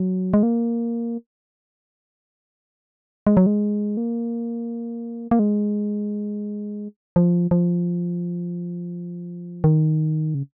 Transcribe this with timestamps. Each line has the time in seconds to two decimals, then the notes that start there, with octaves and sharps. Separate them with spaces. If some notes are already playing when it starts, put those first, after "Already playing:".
Already playing: F#3
0.34 G#3
0.43 A#3
3.27 G#3
3.37 F#3
3.46 G#3
3.97 A#3
5.31 A#3
5.39 G#3
7.16 F3
7.51 F3
9.64 D#3
10.34 C#3